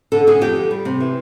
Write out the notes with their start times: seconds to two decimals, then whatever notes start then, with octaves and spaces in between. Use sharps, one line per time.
0.12 D3 A4
0.27 D3 G#4
0.41 F2 G4
0.56 D3
0.71 G3
0.85 C3
1.00 E3